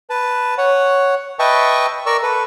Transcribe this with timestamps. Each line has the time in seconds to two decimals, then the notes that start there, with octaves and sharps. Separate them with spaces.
0.10 B4 A5
0.58 C#5 F#5
1.39 B4 D#5 E5 G5 A5 C#6
2.06 A#4 D5 C#6 E6
2.23 A4 B4